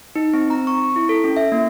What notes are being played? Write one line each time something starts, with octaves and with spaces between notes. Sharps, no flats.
D#4
C4
A#5
C#6
E4
A4
C#4
E5
A#3